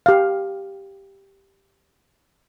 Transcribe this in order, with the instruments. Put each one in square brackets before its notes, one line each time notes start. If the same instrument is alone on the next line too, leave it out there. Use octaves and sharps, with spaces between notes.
[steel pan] G4 F5